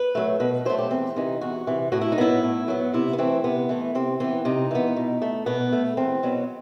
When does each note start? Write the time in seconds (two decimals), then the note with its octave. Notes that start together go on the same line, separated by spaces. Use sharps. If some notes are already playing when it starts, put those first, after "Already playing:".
Already playing: B4
0.15 F#3 A3
0.40 B2 B4
0.65 F#3 A3 C5
0.78 G4
0.91 E2 C4
1.16 C3 E3 D#4
1.41 E2 F#4
1.67 C3 E3
1.92 A2 F#4
2.01 E4
2.12 D#4
2.18 F#3 B3 E4
2.43 A2
2.68 F#3 B3
2.94 C3 E4
3.13 B3
3.18 E3 A3 C4
3.44 C3 B3
3.69 E3 A3
3.95 C3 C4
4.20 E3 B3 C4
4.45 C3 D#4
4.71 E3 B3
4.96 B2
5.22 A3
5.46 B2 B3
5.72 A3
5.97 E2 C4
6.23 B2 F#3 B3